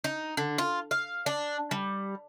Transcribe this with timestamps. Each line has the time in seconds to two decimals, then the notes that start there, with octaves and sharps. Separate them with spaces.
0.04 D#4
0.37 D3
0.58 F4
0.91 F5
1.26 D4
1.71 G3